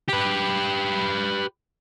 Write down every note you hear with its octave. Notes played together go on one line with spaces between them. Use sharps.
G4 B4